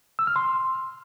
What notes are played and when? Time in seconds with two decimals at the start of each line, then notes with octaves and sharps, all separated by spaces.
0.19 E6
0.27 F6
0.36 C6